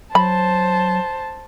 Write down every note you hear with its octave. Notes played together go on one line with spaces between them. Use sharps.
F#3 C5 A5 B5